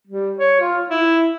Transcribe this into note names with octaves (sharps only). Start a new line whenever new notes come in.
G3
C#5
F4
E4